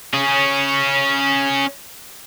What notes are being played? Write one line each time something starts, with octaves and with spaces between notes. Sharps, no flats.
C#4 G#4